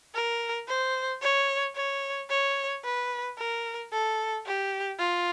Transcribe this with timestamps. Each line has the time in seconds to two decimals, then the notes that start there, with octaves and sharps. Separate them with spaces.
0.14 A#4
0.68 C5
1.22 C#5
1.76 C#5
2.30 C#5
2.84 B4
3.38 A#4
3.92 A4
4.46 G4
4.99 F4